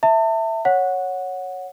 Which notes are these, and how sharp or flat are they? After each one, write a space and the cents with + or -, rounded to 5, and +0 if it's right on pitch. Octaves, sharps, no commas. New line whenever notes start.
E5 +0 A5 +40
C#5 +0 F#5 -10